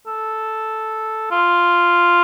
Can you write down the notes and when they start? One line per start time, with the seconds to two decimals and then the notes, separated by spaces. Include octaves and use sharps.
0.07 A4
1.31 F4